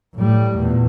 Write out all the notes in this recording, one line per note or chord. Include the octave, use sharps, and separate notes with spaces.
A2 G3
E2 A#2